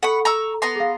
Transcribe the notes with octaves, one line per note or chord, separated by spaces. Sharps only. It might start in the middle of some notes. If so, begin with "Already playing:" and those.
A4 F#5 B5 C#6
A#5 C#6 E6
B3 A#5 C6
G#4 F5